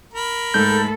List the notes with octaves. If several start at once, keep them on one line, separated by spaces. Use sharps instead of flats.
A#4 B5
G#2 G#3 A3 A4 G6